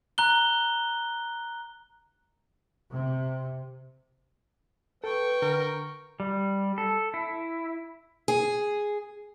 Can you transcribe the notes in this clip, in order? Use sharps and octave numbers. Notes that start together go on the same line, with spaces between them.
A#5 F#6 G7
C3
A4 B4 G5 C#6
D3 A#4
G3
A4
E4
G#4